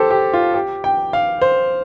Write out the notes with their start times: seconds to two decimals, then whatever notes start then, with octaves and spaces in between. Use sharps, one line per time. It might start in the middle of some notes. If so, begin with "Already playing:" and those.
Already playing: G4 A4 C5
0.10 G4
0.33 F4
0.54 G4
0.84 G5
1.13 F5
1.41 C5